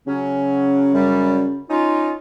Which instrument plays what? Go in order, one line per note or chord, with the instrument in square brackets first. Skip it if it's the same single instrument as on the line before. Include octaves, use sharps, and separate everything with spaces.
[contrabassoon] C#3 [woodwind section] F#3 C#4
[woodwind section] F#2 G3
C#4 D#4 F4